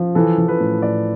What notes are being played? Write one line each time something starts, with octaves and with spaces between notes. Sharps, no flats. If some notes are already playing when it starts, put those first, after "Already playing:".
Already playing: F3
E3 A4
E3
B4
A2
A2 D5